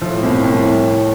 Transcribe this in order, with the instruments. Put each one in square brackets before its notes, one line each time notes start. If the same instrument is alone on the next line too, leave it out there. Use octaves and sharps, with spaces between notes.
[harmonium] A2 A3 [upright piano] F3
[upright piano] C2
C2